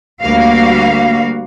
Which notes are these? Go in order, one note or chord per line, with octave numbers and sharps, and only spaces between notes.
D2 G3 A#3 F#4 F5